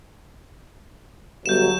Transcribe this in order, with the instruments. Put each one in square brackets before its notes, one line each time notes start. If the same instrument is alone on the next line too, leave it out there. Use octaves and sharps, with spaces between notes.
[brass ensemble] G1 F#3 [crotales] G6 E7